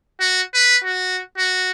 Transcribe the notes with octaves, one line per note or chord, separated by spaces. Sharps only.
F#4
B4
F#4
F#4